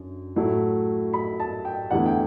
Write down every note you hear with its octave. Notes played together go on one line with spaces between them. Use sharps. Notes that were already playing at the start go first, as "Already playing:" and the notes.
Already playing: F#2 D3
A2 F#3 A3 E4
B5
A5
G5
E2 D3 A3 E4 F#5
G5